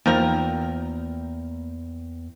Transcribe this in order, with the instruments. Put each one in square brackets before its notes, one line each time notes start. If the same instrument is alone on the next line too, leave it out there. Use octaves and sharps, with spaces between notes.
[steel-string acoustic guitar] E2 G5 [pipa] D#3 F3 A#4 [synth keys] A#3